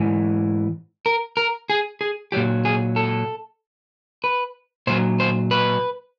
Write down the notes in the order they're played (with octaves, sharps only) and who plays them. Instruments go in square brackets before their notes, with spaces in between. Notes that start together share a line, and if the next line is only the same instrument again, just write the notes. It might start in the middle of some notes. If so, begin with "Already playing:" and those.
Already playing: [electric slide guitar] G#2 E3
A#4
A#4
G#4
G#4
A#2 F#3 G4
G#4
A4
B4
A#2 F#3 C5
C5
B4